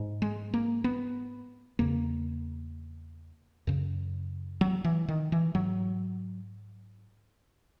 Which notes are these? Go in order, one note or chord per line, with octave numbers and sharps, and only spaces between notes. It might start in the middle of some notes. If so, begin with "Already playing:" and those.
Already playing: G#2
G#3
A#3
B3
E2 C#3 A#3
F#2 C#3
F#3
E3
D#3
E3
G#2 F#3